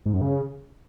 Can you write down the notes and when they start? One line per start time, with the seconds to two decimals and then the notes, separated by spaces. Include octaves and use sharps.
0.06 G#2
0.13 F#2
0.21 C#3